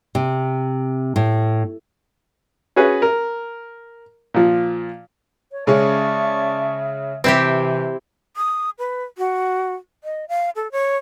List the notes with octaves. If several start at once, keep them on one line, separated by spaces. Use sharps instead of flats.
C3
A2
C#4 F#4 G#4 B4
A#4
A#2 F3
C#5
C#3 G#3 C#4 D5 E5 A5 C#6
C3 E3 C4 E4 G4
D#6
B4
F#4
D#5
F5
A4
C#5